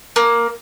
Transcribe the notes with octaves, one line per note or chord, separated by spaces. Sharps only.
A#3